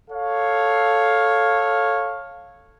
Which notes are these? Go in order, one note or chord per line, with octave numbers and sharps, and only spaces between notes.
A4 C#5 F5